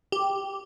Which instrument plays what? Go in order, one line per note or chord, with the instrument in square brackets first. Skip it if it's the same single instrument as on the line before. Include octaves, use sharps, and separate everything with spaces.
[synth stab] G4